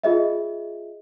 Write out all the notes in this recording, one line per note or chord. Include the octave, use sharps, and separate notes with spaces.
F4 G#4 D#5 E5